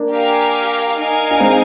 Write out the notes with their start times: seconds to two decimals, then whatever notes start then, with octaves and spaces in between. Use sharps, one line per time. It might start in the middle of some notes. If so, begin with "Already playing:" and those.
Already playing: A#3 D4
0.11 G4 A#4 F5 G#5
0.97 D#4 A#4 F5 G#5
1.31 D4
1.40 G#3 C4